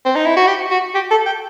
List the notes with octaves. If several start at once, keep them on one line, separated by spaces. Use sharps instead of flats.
C4
D#4
E4
F#4
G4
F#4
G4
A4
G5